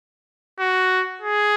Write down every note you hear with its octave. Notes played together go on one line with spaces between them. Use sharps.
F#4
G#4